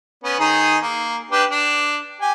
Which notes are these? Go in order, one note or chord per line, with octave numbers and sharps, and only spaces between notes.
B3 C#4
D#3 D#4 G#4
A#3
D4 G4 B4
D4
G4 G#5